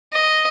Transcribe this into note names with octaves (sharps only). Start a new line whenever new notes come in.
D#5